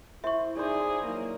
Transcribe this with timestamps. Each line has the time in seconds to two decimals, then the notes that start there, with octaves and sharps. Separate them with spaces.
0.24 E4 C5 E5 C#6
0.57 D#4 G#4 C5 D5
1.06 F#3 A#3